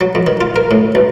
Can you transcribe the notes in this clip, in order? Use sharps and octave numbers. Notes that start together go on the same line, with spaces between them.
F#3
F2
D#3
F4
A#4
A2
B1